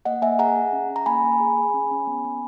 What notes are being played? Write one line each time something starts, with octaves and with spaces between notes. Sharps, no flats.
A#3 D#5 F#5
A#3 E5 G#5
G#4 F#5 A#5
G#4
C#4
C#4
A#5
A#3 G#5 B5
A#3
G#4
G#4
C#4
C#4
B3
B3